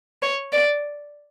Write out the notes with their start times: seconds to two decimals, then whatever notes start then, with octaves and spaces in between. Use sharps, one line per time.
0.22 C#5
0.53 D5